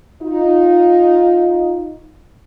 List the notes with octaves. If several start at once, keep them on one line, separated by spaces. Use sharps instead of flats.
D#4 F4